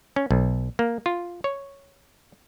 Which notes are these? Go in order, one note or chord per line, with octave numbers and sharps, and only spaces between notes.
C#4
B1
A#3
F4
C#5